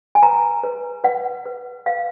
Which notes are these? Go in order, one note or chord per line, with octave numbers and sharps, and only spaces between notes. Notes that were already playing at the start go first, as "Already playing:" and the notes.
G#5
B4 A#5
B4
B4 F#5
B4
B4 F5